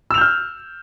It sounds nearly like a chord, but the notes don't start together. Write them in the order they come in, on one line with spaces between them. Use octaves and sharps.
E6 F7 G6 F6